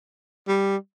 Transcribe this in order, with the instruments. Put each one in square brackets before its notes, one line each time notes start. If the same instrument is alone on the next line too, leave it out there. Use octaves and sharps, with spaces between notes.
[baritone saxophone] G3